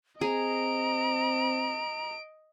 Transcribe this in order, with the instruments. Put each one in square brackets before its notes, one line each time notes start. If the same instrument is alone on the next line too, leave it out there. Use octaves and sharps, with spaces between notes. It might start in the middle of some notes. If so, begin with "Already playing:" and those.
[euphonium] C4 [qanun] G#4 [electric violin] D#5 D7 [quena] A#5